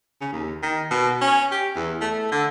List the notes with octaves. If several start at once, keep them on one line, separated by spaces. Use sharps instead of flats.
C#3
D#2
D#3
B2
C#4
G4
E2
A3
D3